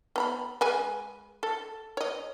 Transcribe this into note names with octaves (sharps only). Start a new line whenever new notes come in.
B3 A#5 B5
G#3 B4 G#5
A4
C#5 D#5